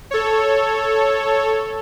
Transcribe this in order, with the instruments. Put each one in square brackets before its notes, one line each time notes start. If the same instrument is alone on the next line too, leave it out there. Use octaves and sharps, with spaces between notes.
[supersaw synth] A4 C#5